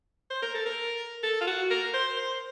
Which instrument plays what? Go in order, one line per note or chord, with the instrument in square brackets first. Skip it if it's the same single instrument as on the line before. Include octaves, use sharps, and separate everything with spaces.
[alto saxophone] C5
A#4
A4
A#4
A4
F4
F#4
A#4
C5
C5